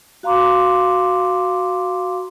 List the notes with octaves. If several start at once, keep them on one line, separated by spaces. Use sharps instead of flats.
F#4 F5 A#5 C6 D6